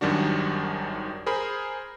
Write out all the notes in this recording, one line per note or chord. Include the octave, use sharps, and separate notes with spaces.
G#1 F#2 D#3 G3 D4 F#4
G#4 A#4 C5 B5